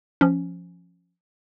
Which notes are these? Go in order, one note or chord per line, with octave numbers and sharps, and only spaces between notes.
F3 C#4